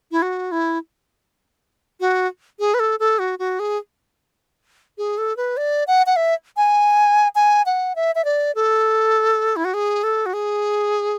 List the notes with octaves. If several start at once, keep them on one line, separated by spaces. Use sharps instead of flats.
E4
F#4
E4
F#4
G#4
B4
A4
A4
F#4
F#4
G#4
G#4
A4
B4
D5
F#5
F#5
E5
G#5
G#5
F#5
E5
E5
D5
A4
E4
F#4
G#4
A4
F#4
G#4